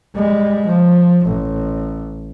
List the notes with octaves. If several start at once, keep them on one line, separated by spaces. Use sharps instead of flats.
G3 G#3
F3
A1